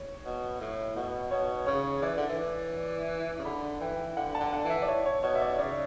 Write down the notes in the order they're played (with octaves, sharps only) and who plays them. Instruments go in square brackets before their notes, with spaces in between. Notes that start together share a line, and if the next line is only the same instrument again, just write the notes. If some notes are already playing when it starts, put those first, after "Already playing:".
Already playing: [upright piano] C#5
[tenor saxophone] B2
A2
B2
[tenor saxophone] B2 [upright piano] C#5
[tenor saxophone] C#3 [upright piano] C#5
[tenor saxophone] E3 [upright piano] D5
[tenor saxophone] D3
E3
C#3
[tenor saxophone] D3 [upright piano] B5
[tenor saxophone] E3 [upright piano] G5
[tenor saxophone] D3 [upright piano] F#5
[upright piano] A5
[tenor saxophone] D3
[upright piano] F#5
[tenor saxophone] E3
[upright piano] E5
D5
C#5
C#5
[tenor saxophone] B2 [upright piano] C#5
[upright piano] E5
D5
[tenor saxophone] C#3 [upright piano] D5